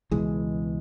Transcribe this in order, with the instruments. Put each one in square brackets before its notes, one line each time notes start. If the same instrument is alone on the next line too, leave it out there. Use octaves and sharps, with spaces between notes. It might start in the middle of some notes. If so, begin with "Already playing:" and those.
[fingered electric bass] C#2 B2 E3 G#3